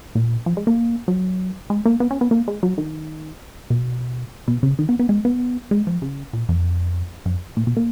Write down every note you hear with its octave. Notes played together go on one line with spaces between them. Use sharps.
A#2
F3
G#3
A#3
F#3
G#3
A#3
B3
C#4
B3
A#3
G#3
F#3
D#3
B2
B2
C#3
D#3
B3
B3
G#3
B3
G#3
F3
C#3
A#2
F2
F#2
A#2
B2
A#3